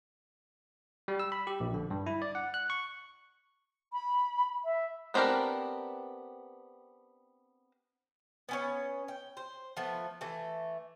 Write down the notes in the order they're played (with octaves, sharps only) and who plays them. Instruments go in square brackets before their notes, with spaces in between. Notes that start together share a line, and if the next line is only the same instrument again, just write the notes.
[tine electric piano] G3
E6
B5
G4
A#1
D3
G2
E4
D5
F#5
F#6
C#6
[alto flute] B5
E5
[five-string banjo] B3 C4 D4 G4 A#4
[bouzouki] B3 C#4 C#5
G5
C5
F3 A3 B3
E3 A3